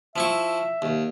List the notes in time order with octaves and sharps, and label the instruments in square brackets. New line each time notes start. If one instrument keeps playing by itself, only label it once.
[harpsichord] F3 E4 C#6 [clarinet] E5
[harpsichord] D#2